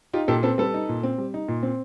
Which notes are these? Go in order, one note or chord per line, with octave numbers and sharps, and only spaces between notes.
D#4 F4 G4
A#2 G4 A4
C4 A4 B4
G3 A4 B4
D#4
A#2
C4
G3
D#4
A#2
C4